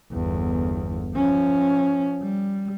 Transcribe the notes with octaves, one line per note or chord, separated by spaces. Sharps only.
G1 E2
F3 C#4
G3